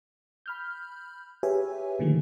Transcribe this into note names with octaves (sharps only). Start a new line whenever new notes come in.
B5 F6 G6
G4 G#4 B4 C#5 E5 G#5
A#2 D3 D#3 F3 A3